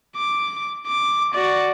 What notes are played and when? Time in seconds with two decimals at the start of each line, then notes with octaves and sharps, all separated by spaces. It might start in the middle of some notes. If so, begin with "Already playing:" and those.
0.16 D6
0.87 D6
1.34 F#4 D5